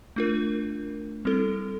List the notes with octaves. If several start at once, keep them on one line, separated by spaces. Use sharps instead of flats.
A3 D4 F4 A#4
G3 C4 E4 A4